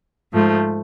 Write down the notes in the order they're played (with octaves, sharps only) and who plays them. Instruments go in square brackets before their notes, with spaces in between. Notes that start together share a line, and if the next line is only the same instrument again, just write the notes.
[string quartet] G#2 F3 A3